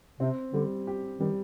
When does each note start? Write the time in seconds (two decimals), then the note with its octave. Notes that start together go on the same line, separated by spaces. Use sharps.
0.20 C3 C4
0.53 D3 G3
0.87 G4
1.19 D#3 G3